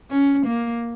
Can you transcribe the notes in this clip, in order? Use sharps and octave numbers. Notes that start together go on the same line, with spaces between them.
C#4
A#3